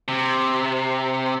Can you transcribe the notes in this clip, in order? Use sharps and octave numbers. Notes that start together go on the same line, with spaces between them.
C3